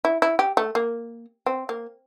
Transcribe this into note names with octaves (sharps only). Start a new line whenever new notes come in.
E4
E4
G4
A3
A#3
C4
A#3